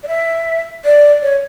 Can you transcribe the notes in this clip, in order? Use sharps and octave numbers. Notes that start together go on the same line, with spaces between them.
D5
E5
D5
C#5